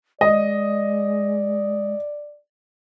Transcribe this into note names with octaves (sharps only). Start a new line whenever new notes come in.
G#3 D5 D#5